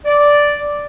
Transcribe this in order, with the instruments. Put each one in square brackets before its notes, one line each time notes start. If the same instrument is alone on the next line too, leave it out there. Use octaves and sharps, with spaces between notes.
[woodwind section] D5